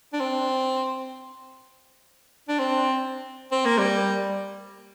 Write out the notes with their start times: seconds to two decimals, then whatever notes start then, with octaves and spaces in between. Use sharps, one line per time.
0.13 D4
0.20 C4
2.48 D4
2.59 C4
3.52 C4
3.65 A#3
3.78 G3